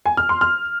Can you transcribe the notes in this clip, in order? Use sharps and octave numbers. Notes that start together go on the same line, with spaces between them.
G#5
F6
C6
F6